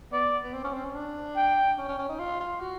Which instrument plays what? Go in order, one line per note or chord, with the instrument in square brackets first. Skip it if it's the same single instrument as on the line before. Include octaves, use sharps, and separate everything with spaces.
[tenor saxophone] B3 [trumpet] D5
[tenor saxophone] B3
C4
C#4
C4
C#4
D4
[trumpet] G5
[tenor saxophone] C#4
C#4
C#4
D#4
F4
F4
F#4